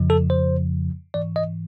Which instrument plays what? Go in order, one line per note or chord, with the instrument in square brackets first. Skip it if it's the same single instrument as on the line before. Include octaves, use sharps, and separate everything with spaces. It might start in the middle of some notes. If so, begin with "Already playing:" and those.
Already playing: [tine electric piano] F2 C#3 F3
A4
C5
G#2 E3 D5
D#5